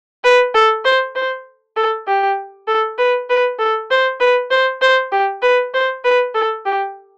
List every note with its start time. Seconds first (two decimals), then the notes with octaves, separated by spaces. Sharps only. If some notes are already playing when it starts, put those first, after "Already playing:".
0.24 B4
0.54 A4
0.85 C5
1.15 C5
1.77 A4
2.07 G4
2.67 A4
2.98 B4
3.30 B4
3.59 A4
3.91 C5
4.20 B4
4.51 C5
4.82 C5
5.12 G4
5.42 B4
5.74 C5
6.04 B4
6.35 A4
6.66 G4